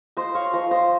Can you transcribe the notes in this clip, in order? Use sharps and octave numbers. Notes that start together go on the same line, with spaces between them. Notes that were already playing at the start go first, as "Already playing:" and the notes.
F4 C5 D#5
C#5 F5
F3 C5 D#5
C5 D#5